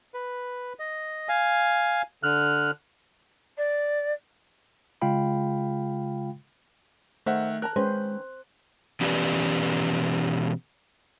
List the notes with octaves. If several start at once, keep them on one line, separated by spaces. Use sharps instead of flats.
B4
D#5
F5 G#5
D3 F6 F#6
D5
C#3 G#3 F4 F5 G5 B5
D#3 A3 C5 E5 F#5
A#4 A5 A#5 F#6
D#3 G#3 C#4 B4 C5
B2 E3 C#4 G4 B4 D5